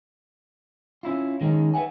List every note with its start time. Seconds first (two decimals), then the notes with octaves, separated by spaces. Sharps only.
1.03 C#4 E4 F4
1.41 D#3 G#3 A3 C#4 D#4
1.74 B4 C5 E5 F#5 G#5